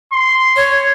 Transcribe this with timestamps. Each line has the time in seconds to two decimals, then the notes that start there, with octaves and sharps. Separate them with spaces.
0.13 C6
0.56 C#5